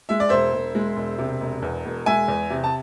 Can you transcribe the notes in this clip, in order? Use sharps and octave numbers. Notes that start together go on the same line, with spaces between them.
G#3 E5
D5
E1 C5 E5
E1
G#3
E1
C3
E1
E2
E1
G#3 E5 G#5
E2
C3
A5